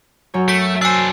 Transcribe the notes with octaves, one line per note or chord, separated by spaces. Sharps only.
F#2 F#3 C#5
A3 B6 D7
D4 C5 G#5 E6